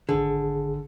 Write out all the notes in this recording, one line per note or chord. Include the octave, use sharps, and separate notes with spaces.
G#1 D3 G#4